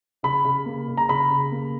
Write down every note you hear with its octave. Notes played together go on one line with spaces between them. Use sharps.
C#3 B5
C#3
A#3
C#3
A#5
C#3 B5
C#3
A#3